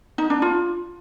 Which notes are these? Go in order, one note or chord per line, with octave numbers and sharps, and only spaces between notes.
D#4
D4
F4